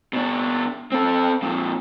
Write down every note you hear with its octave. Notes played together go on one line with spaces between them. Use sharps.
B2 D4
C4 A4
F2 A#2